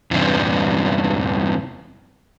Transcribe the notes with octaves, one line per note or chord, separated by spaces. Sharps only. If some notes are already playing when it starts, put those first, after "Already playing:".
E2 G2 C3